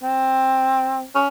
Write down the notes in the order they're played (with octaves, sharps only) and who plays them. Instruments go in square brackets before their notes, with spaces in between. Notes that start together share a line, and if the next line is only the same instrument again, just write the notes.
[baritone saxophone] C4
C#4